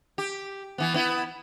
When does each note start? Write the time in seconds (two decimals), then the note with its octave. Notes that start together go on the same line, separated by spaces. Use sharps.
0.18 G4
0.78 E3 B3
0.94 B3 E4